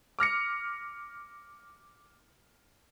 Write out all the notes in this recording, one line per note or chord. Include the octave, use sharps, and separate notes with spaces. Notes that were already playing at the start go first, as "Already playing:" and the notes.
D6 F6 A#6 C#7